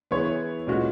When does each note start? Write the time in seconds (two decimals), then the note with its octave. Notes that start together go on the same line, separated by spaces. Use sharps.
0.11 E3 B3 E4 G#4 C#5
0.67 A#2 G#3 C#4 F#4